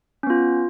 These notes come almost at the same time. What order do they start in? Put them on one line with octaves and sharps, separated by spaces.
C#4 B3 F4